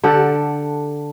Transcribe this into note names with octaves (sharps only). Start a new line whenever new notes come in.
D3 G4 A4 F#5